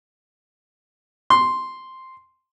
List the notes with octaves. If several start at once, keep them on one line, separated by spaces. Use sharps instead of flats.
C6